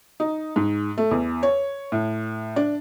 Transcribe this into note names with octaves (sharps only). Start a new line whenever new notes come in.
D#4
G#2
A3
E2
C#5
A2
D4